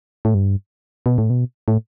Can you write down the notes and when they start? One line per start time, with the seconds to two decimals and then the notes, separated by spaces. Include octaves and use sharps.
0.25 A2
0.34 G2
1.06 B2
1.18 A2
1.30 B2
1.68 A2